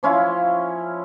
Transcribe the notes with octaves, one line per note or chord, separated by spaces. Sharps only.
F3 C#4 E4 F4